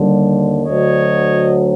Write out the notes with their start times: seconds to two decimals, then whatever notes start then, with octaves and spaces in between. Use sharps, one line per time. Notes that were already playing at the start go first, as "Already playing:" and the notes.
Already playing: D#2 D3 G3
0.66 D2 D3 F#3 C#5 D#5